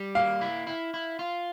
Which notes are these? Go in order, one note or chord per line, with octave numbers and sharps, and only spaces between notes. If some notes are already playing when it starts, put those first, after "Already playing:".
Already playing: G3
A#3 F5
E4
E4
E4
F4